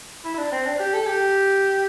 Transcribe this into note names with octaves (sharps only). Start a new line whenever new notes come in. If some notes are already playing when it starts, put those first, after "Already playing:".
E4
E4
D4
C4
D4
G4
A4
G4